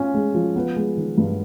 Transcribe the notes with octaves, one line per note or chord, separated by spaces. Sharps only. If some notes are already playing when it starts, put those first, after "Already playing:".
Already playing: C#4 F4
G#3
F3
B3
G#3
D#3
G2